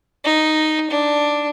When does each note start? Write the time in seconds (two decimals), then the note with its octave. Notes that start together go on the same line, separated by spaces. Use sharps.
0.24 D#4
0.90 D4